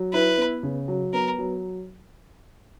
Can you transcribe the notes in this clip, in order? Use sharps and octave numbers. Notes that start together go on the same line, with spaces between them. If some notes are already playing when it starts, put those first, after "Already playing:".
Already playing: F#3
E4 B4
B3
C#3
F#3
B3 A#4
F#3